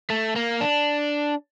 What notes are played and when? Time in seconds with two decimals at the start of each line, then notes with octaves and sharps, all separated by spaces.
0.10 A3
0.36 A#3
0.61 D4